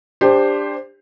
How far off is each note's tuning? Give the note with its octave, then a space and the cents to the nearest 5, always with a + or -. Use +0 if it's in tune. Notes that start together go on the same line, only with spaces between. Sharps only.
D4 +0 G4 +25 C5 +0